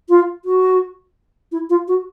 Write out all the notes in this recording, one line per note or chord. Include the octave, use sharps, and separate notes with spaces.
F4
F#4
E4
F4
F#4